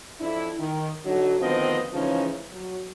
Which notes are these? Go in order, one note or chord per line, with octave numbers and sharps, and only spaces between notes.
F2 D4 E4
D#3
D3 F#3 D#4
D2 D#3 F3 B3 C4 D#5
C#3 E3 F3 G#3 C#4 D#4
F#3